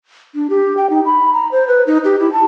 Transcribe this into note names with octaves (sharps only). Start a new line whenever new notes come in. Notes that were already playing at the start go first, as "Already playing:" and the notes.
D4
G4
G5
D#4
B5
A#5
C5
B4
D#4
G4
E4
A5